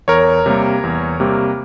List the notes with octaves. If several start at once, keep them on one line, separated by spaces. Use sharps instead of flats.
E2 A#4 C#5
C3 G3 A#3
E2
C3 G3 A#3